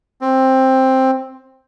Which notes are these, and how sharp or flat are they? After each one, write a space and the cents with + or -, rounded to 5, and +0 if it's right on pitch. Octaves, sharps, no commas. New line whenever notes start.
C4 +10